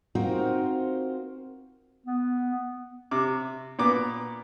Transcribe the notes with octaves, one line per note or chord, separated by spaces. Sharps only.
C4 D#4 F4 F#4 A#4 C5
B3
C3 D6
A#2 B3 D6